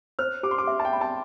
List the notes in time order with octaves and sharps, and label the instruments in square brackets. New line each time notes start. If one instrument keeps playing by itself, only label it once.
[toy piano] C5 [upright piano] F6
[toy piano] G4 [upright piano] D6
[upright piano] C6
D6
[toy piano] E5
[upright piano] A5
G5
[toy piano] B5
[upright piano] A5